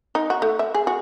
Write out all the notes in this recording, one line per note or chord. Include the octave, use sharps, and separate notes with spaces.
D#4
F#4
A3
E5
G#4
F#4